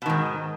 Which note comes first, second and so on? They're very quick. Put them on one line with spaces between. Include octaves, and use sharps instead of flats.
B2 D#3 G#2